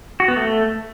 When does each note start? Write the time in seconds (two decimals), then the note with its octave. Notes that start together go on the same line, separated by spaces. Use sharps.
0.20 F#4
0.28 B3
0.37 A3